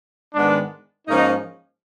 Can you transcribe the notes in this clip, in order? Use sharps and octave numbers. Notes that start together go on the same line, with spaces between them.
G#2 D#3 G#3 B3 D4
G#2 F3 A#3 C#4 D#4